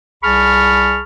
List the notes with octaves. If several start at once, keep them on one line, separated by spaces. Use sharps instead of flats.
C2 G#4 A5 B5 C#6 F6